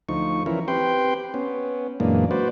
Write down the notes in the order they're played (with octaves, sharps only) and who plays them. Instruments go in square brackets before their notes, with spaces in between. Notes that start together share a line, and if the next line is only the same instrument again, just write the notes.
[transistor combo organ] D2 F3 D#4 C#6
E3 F3 C#4 E4 A#4
C4 G4 B4 G5 C6
B3 C#4
F#2 A#2 E3 G#3 A#3 D4
F#4 B4 C5 D5